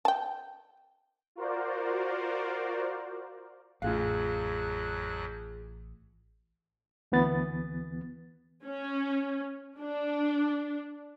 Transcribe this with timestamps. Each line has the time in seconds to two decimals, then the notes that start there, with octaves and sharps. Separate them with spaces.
0.05 G5 A5
1.36 F4 F#4 A#4 C5 D5
3.82 A1 F2 F#3 F4 G#4 F5 F#6
7.12 D2 E3 B3 A6
8.65 C#4
9.79 D4